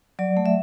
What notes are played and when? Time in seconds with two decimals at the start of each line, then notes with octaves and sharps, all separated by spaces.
0.19 F#3 D5
0.37 A3
0.46 E5